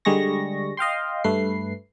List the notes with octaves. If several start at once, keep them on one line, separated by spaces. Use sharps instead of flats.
D3 G3 G#3 G#4 C#6 A#6
D#5 F5 G5 C6
G2 A3 B4 C7